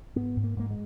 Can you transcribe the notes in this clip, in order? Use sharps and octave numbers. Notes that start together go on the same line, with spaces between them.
G#2 B3
G#2
A#3
G#2 A#3
G#3